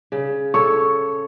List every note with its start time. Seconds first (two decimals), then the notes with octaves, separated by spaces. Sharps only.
0.12 C#3
0.54 A4 C#5 C#6